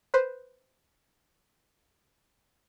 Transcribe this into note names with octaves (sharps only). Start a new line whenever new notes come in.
B4 C5